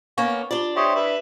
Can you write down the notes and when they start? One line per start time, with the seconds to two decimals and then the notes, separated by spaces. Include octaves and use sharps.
0.18 A#3 B3 C#4 C#6
0.51 D4 F4 G4 D5 G7
0.76 G4 C5 C#5 E5 C#6 D#6
0.95 G4 B4 E5